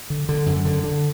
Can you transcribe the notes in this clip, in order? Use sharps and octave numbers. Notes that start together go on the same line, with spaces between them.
D3
D3
F#2
D3
D3